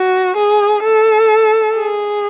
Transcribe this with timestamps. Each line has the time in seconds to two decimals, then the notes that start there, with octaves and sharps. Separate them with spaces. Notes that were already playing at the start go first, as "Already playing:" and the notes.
Already playing: F#4
0.37 G#4
0.83 A4
1.76 G#4